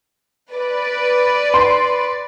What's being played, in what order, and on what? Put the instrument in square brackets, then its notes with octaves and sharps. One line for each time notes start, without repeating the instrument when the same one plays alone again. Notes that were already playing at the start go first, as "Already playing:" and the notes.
[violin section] B4 D5
[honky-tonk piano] C6